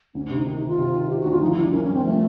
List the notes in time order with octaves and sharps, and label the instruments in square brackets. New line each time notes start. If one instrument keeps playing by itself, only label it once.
[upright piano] D2 [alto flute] C#4
[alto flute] D4
[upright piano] C3
[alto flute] D#4
[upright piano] D#3 [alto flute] D#4
[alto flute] D#4
[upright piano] D#3
[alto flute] F4
[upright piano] C3
D#3
[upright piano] D#3 [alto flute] G4
[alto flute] F#4
[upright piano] D2
[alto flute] F4
[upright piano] F3 [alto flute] D#4
[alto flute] E4
[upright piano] G2
[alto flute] D4
[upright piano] A#3 [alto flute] C#4
[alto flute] C#4
[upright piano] G2 [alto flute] C4
[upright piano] F3 [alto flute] A3